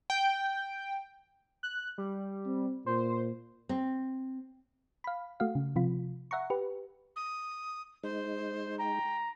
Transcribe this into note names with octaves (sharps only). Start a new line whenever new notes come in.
G5
F#6
G3
C4
A#2 C5
C4
F5 B5
A3 F#4 F5
C#3
C3 F3 F4
E5 F#5 A#5 C#6
G4 B4
D#6
G#3 D#4 C5
G5 A#5